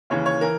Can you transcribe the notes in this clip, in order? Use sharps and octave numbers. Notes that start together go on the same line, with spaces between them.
D#2 C#3 E3 C#5
C#5
E3 A#4